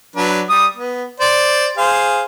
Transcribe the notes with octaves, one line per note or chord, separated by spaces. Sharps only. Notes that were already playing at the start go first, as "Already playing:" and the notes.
F#3 D4 B4
G3 D#6
B3
C5 D5
G#4 C5 F5